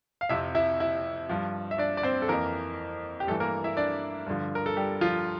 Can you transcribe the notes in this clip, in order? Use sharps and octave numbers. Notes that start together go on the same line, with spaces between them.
F5
F2 C3 F3 E4 E5
E4 E5
E4 E5
G2 F3
E5
D4 D5
D5
C4 C5
A4
F2 E3 A#3 A#4
G4
G2 E3 A3 A4
A#3 A#4
E4 E5
D4 D5
G2 D3 F3
A#4
A4
G3 G4
F3 F4